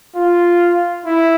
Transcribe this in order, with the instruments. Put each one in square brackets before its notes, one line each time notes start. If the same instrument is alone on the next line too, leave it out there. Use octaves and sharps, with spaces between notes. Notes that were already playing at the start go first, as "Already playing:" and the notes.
[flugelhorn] F4
E4